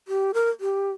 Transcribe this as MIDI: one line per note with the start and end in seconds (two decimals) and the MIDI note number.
0.08 0.31 67
0.34 0.50 70
0.60 0.91 67